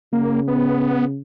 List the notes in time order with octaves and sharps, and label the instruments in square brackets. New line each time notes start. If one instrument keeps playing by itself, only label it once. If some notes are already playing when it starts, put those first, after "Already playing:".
[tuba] C#3 [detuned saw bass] A#3
[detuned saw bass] B3